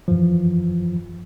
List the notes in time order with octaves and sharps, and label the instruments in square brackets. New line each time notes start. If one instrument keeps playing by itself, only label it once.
[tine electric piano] F#2 E3 F3